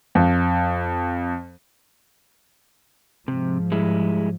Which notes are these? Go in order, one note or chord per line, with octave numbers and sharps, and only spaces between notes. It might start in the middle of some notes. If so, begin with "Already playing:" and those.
F2
G#2 C3 F3
G3 G#3 E4